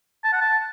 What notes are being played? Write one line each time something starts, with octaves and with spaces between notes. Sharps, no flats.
A5
F#5
A5